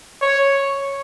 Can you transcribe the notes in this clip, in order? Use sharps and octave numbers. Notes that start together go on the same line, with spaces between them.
C#5